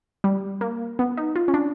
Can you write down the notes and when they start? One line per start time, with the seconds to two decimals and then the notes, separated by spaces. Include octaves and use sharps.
0.24 G3
0.61 A#3
0.99 B3
1.17 D#4
1.36 F4
1.48 C#4
1.54 D4